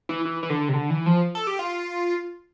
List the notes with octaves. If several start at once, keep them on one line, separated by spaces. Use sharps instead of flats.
E3
E3
E3
D3
C3
D3
E3
F3
A4
G4
F4